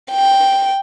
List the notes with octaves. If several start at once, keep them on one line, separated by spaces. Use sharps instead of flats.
G5